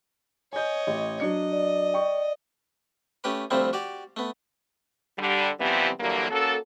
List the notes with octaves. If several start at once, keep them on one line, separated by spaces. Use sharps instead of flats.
C#5 D#5 G#5 G6
A1
F#3 D4 D#5 C#7
D5
G5 C#6
A3 C#4 G4 B4
D2 F3 G3 A3 C4 E4
F#4 G4 D5
A3 B3
D3 G3
C3 E3 F3 G3 B3 C4
D3 E3 F#3 G3 A#3
A#3 C#4 F#4 A4